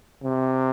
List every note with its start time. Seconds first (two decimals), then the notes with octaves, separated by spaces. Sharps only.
0.23 C3